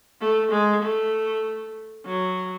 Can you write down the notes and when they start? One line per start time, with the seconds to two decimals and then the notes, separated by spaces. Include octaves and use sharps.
0.21 A3
0.52 G#3
0.83 A3
2.06 F#3